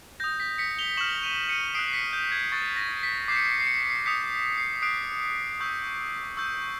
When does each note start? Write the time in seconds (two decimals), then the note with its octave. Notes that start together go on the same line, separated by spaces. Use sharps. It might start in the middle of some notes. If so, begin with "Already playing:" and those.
0.20 D#6 G6 A#6
0.40 B6
0.58 B6 C#7
0.79 F7 G7
0.97 C#6 F6 E7 F#7
1.23 D#7 F7
1.49 C#7 D#7
1.75 D#6 F#6 C7 D7
1.88 C7
1.93 B6 C#7
2.13 G6
2.32 G#6
2.52 C#6 F#6 A6
2.77 A#6
3.03 B6
3.28 D6 G6 C7
3.36 C#7
3.44 C7
3.51 C#7
3.60 C7
3.67 C#7
3.75 C7
3.83 C#7
3.90 C7
4.06 D#6 G6 B6 C#7
4.58 C7
4.82 D#6 F#6 C7 D7
5.60 C#6 E6 G6
6.37 C#6 E6 G6